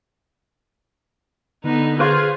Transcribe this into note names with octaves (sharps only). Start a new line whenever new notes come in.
D3 B3 D#4
F4 G#4 B4 C5 C#6